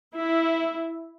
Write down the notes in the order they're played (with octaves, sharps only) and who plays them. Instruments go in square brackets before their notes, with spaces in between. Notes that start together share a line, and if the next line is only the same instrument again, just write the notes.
[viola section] E4